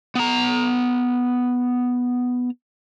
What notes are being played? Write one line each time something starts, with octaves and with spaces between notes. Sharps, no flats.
B3 A#5